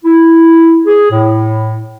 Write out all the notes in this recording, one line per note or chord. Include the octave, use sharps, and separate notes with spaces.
E4
G#4
A2